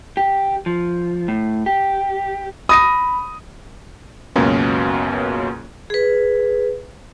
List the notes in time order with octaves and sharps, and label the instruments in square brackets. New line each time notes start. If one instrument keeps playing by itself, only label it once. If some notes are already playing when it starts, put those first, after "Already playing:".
[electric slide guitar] G4
F3
A2
G4
[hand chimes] B5 [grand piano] D#6 A#6 D#7
[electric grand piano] C#2 F#2 B2 A#3 C#4
[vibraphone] G#4 B4